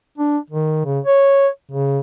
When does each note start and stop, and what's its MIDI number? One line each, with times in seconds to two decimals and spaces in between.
0.18 0.38 62
0.50 0.80 51
0.85 1.00 49
1.06 1.48 73
1.71 2.00 49